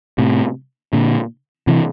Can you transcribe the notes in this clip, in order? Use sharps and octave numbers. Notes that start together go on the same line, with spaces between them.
A2 C3
A#2 D3
C3 E3